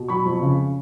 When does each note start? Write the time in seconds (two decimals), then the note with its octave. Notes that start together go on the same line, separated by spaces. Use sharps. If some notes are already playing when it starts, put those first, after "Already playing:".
Already playing: B2
0.08 F#3 B5 C#6
0.25 F2
0.42 C#3